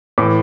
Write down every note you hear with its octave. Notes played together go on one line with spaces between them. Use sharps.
A2 E3 D6